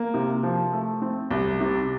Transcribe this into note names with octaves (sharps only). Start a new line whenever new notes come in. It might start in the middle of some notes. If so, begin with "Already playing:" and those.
Already playing: A#3
C3
F3
A3
C4
C2
C3